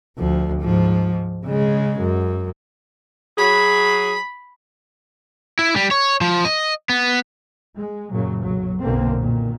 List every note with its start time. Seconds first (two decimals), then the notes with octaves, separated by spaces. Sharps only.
0.18 D2 F3
0.61 G#2 F3
1.45 C#3 G#3
2.00 F#2
3.38 F#3 G#4 B5
5.59 E4
5.76 G3
5.91 C#5
6.21 F3
6.45 D#5
6.89 B3
7.76 G#3
8.12 F#2 A#2 C#3 F#3
8.42 B1 F#3
8.82 B1 F#2 B2 D3 A#3 C4
9.18 A#2 D#3